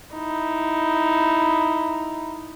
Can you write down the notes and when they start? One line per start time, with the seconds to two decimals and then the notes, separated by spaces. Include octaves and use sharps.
0.15 D#4 E4